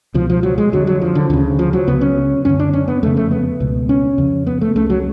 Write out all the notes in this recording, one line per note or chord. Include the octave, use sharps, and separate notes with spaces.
C#2 B2 F3
F3
F#3
G#3
F2 D3 F#3
F#3
F3
D3
D2 C#3 D3
F3
F#3
C#2 C#3 B3
C#4
F#2 D3 C#4
D4
C#4
B3
F2 C#3 A3
A3
B3
C#2 B2
C#4
F2 C#3
B3
A3
C#2 C#3 A3
F#3